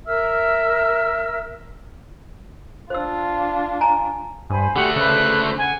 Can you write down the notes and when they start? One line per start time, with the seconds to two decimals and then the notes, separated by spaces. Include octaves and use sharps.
0.07 A#4 E5 E6 F6
2.90 D4 F4 C5 E6
3.81 G#5 A#5
4.50 G2 C5 G#5 B5
4.76 D3 A3 G4 F#5
4.96 C#3 B4 C5 F#6
5.58 F#5 G#5